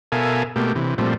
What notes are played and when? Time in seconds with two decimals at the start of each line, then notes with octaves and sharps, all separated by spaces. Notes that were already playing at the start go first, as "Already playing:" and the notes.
0.12 B2 A4 A#4 E5 F5 G#5
0.56 B2 A3 A#3 G4
0.75 C3 E3
0.98 A#2 F3 G3 A3 C4